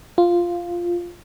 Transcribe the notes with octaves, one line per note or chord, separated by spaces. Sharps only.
F4